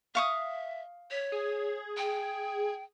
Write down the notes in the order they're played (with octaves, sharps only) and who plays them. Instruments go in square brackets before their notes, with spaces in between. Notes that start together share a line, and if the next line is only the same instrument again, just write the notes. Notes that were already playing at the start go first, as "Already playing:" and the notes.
[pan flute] E5 [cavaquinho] F5 C#6 D#6
[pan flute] C#5 [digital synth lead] B6
[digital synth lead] G#4
[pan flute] G5